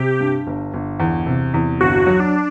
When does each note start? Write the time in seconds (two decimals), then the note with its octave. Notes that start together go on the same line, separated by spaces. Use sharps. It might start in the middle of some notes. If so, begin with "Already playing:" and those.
Already playing: C3 G4
0.20 G2
0.47 G1
0.74 G1
1.00 E2
1.26 C3
1.54 E2
1.81 G1 F#4
2.07 F#3
2.20 D4